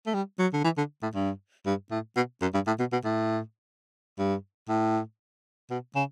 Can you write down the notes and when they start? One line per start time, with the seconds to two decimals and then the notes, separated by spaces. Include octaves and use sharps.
0.07 A3
0.14 G3
0.39 F#3
0.54 D3
0.64 E3
0.78 D3
1.03 A2
1.15 G2
1.66 G2
1.91 A2
2.17 B2
2.42 F#2
2.54 G2
2.67 A2
2.79 B2
2.92 B2
3.05 A2
4.19 G2
4.69 A2
5.70 B2
5.95 C#3